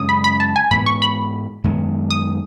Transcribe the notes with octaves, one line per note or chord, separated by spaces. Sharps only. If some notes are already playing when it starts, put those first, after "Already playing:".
Already playing: F#2 C#3 G#3 C#4 D#6
B5
B5
A5
G#5
G#2 E3 B3 B5
C#6
B5
F#2 D#3 G#3 B3
D#6